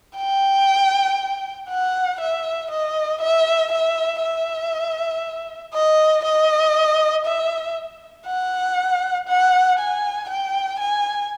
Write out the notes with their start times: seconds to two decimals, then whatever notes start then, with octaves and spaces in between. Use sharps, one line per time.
0.18 G5
1.69 F#5
2.20 E5
2.71 D#5
3.21 E5
3.72 E5
4.22 E5
5.74 D#5
6.25 D#5
7.25 E5
8.26 F#5
9.28 F#5
9.79 G#5
10.29 G5
10.79 G#5